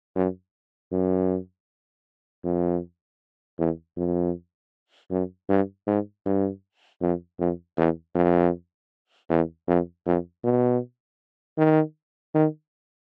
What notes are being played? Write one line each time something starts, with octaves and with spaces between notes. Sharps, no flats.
F#2
F#2
F2
E2
F2
F#2
G2
G#2
G2
F2
F2
E2
F2
E2
F2
F2
B2
D#3
D#3